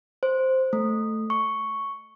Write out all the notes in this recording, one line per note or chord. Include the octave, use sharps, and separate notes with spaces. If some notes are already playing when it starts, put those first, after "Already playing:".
C5
A3
C#6